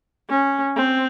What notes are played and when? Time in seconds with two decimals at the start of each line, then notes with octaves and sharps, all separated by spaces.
0.30 C#4
0.76 C4